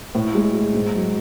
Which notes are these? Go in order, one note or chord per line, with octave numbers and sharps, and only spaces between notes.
A2
G#3
G#3
G#2
F#3